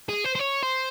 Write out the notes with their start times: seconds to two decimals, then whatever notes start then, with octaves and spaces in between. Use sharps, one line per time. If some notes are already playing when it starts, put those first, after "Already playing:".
0.09 G#4
0.25 C5
0.35 C5
0.39 C#5
0.63 C5